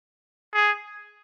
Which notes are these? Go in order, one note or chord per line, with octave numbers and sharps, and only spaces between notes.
G#4